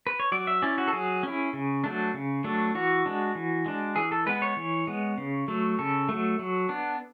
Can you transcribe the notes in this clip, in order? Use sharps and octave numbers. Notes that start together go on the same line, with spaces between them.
B4
C#5
F#3 D5
E5
C#4 E4 D5
F#4
A4
F#3 G#4
C#4 E4
C#3
F#3 A3 D4
C#3
F#3 A3 D4
E3 F#4
G#3 D4
E3
G#3 D4
E3 G#4
A4
G#3 B3 B4
C#5
E3
G#3 B3
C#3
F#3 A3
C#3 A4
F#3 A3
F#3
B3 D4